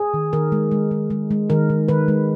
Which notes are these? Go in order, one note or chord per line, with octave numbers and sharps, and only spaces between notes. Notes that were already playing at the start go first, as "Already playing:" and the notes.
Already playing: G#4
D#3
D#3 A#4
G#3
G#3
G#3
G#3
G#3
D#3 A#4
D#3
D#3 B4
G#3